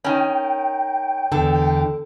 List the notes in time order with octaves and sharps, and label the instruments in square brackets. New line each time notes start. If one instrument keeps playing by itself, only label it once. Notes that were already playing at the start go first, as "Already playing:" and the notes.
[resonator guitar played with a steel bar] D#3 C#4 [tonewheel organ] G5
[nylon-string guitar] E2 D3 [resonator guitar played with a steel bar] A4